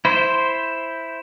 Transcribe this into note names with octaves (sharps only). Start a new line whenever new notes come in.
E4 C5